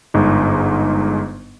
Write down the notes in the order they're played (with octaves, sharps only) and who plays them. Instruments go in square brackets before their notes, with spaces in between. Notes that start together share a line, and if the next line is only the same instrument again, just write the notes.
[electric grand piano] G1 G#2 D#4